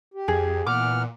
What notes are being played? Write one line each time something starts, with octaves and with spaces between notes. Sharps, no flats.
G4
F2 G#4
A#2 E3 B3 F#5 D6 F6